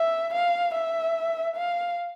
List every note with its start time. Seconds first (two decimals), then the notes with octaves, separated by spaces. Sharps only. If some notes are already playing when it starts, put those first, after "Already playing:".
Already playing: E5
0.34 F5
0.74 E5
1.56 F5